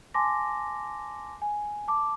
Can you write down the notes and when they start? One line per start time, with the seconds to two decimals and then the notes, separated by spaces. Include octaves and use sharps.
0.14 G#5 A5 C6 D6 A#6
1.42 G#5
1.88 A5 D6